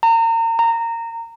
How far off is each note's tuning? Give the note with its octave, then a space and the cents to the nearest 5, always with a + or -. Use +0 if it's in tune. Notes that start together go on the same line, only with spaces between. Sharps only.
A#5 -35
A#5 -20